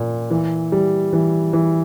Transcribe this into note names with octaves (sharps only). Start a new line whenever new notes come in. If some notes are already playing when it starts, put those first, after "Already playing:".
Already playing: A#2
E3
G3
E3
E3